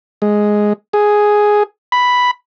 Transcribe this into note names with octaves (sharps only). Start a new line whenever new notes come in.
G#3
G#4
B5